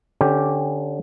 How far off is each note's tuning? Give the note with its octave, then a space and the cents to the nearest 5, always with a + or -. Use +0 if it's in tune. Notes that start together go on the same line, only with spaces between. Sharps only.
D3 +0 C#4 -20 G4 +0